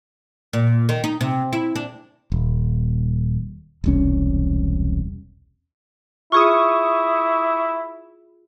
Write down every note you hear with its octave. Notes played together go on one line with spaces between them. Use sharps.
A#2
D#3
D#4
C3
E4
D4
D#1
E1 C2 C#4
E4 F4 G#4 E5 C#6 D#6